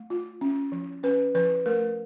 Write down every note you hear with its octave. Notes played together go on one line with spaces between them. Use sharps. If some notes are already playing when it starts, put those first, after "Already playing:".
Already playing: A3
F4
C#4
F3
C#4 B4
F3 B4
A3 A#4